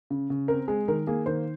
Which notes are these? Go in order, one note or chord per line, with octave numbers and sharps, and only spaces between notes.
C#3
C#3
C4 A#4
G#3 G#4
D#3 A#4
A#3 G#4
D#3 C5